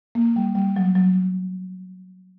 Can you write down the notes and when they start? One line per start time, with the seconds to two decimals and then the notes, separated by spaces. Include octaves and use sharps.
0.15 A#3
0.36 G3
0.55 G3
0.76 F#3
0.96 F#3